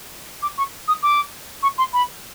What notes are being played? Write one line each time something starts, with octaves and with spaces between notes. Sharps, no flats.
D6
C#6
D#6
D6
C#6
C6
B5